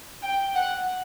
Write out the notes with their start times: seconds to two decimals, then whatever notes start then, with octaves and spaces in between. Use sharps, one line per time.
0.23 G5
0.55 F#5